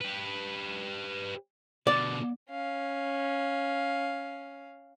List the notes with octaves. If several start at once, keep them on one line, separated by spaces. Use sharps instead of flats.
G4 B4
B2 D3 D5
C#4 F5